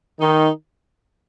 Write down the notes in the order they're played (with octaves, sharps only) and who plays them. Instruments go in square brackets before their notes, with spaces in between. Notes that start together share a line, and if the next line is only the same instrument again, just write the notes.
[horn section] D#3 D#4